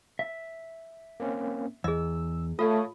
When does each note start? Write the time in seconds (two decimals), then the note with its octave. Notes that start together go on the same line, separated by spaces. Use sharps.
0.19 E5
1.20 A#3 C4 C#4
1.84 E2 G#4 D#5 E6
2.59 A3 F4 C#5 F5 D#6